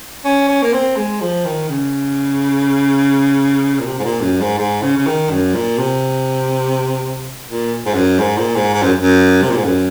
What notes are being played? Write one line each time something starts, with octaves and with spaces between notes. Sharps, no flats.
C#4
C#4
A#3
C4
G#3
F3
D#3
C#3
A#2
C3
G#2
A#2
F#2
G#2
G#2
C#3
C#3
D#3
F#2
A#2
C3
A#2
G#2
F#2
G#2
A#2
G#2
G#2
F#2
F#2
C3
A#2
G#2
F#2